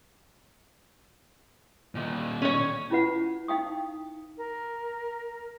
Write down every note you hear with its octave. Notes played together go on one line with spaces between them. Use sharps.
A#2 D#3
C#4 C#5
C#4 E4 F4 B4 F#5
D#4 F5 G5 D#6
A#4